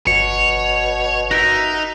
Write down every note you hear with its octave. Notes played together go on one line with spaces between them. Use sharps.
G1 B2 C#5 C#7
D#4 F#4 A#4 E5